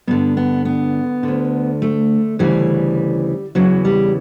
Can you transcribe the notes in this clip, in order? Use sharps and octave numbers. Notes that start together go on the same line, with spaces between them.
G2 D3 B3
B3
B3
D2 D3
A3
D2 C#3 E3 G3
E2 C#3 E3 F#3
G3